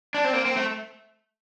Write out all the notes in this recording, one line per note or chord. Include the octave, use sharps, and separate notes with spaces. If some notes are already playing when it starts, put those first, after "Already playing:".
D4
C4
A#3
C4
A3